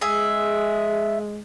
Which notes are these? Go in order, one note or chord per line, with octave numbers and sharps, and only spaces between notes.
G#3 G#4 E5